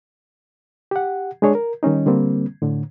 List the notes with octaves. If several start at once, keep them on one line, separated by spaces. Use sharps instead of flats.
G4 F#5
G#3 D4 G#4 C#5
A#4
D#3 G3 C#4 D#4
D3 G3 A#3 C4
A2 D3